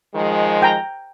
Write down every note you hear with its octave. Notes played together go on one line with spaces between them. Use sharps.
D#3 F3 G#3
G5 A#5